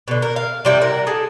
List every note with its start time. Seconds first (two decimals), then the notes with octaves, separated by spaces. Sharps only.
0.08 B2 D3
0.22 A#4
0.36 F5
0.65 C3 G3 E4
0.81 A#4 F#5
1.07 G#4 A4